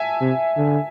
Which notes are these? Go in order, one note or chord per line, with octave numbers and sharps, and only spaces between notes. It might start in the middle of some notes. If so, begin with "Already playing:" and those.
Already playing: E5 G#5 A5
C3
D3